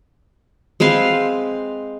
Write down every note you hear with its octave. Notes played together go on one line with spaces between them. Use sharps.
G#3 C4 B4 F5